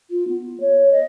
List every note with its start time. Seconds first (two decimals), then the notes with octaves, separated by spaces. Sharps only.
0.10 F4
0.28 B3
0.60 C#5
0.92 D#5